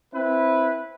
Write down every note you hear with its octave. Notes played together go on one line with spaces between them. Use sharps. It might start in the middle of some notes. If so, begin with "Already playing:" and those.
C4 E4 B4